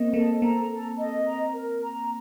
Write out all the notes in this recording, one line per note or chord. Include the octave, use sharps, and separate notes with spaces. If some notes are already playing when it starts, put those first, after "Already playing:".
Already playing: A#3 C4 D#5
A#3 A4
A#3 A#5
A4
D#5
A#5
A#4
A#5